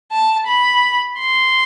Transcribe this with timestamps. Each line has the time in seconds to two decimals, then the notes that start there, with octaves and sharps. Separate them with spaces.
0.12 A5
0.47 B5
1.19 C6